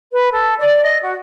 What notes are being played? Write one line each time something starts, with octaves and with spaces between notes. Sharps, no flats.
B4
A4
D5
D#5
F#4